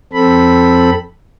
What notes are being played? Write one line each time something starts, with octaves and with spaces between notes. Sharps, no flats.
F2 C4 A4 B5